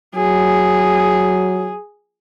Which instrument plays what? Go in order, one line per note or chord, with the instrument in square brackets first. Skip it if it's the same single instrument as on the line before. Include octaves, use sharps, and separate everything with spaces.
[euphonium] F#3 [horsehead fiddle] G#4